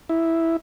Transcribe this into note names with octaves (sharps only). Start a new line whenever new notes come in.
E4